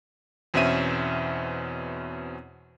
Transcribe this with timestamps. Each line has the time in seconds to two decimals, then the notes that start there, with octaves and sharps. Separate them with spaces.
0.54 E2 B2 C4 C#4 E5 D#7